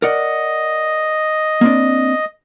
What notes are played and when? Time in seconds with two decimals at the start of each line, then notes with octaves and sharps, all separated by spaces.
0.02 A#4 D5 D#5 F#5
1.61 A#3 C4 D4